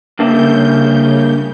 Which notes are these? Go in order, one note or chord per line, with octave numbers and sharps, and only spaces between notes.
G2 C#3 A#3 E5 G6